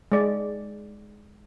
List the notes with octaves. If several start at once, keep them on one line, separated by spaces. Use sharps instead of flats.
G#3 D5